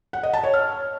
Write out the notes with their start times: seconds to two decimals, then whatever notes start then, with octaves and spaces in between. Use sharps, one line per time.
0.13 F#5
0.23 D#5
0.33 A5
0.44 C#5
0.54 F6